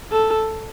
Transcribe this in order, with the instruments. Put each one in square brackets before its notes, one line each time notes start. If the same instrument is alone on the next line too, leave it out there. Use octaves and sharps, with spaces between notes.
[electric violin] A4